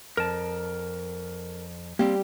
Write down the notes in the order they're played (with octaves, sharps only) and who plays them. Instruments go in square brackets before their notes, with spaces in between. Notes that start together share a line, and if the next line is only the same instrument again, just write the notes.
[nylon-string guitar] F2 [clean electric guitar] A#4 A5
[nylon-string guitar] G3 G4 [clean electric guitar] A#3 C4